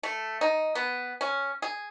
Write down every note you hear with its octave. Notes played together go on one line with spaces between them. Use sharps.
A3
D#4
B3
C#4
G#4